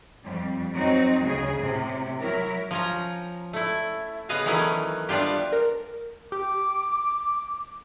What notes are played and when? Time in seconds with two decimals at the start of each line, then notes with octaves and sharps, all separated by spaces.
0.22 F2 G3
0.74 F#3 C4 D#4 F#4
1.23 D2 C#3 G#4
1.60 A2 C3
2.18 F#3 E4 A#4
2.71 F3 C#4 A#5
3.53 A3 E4
4.29 C#3 B3 B4 D#5 F5 G#5
4.46 D#3 E3 F#3 A3 B3 C#4
5.09 G3 B3 D4 F4 G4
5.53 A#4
6.32 G4 D6